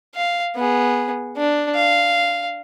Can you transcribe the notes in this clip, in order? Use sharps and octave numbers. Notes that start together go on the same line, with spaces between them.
F5
B3 G#4
D4
F5